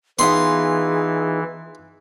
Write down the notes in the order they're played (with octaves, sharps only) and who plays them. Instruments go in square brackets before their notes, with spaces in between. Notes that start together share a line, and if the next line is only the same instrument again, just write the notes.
[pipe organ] E3 [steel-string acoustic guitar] B3 D#4 F4 [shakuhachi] G#4 [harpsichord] C6